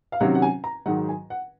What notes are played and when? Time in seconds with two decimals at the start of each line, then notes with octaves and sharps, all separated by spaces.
0.12 F5
0.20 C3 D#3 F#3 C#4 F#5
0.35 F#5
0.42 G#5
0.64 A#5
0.86 G#2 D#3 F#3 F#5
1.09 G#5
1.30 F#5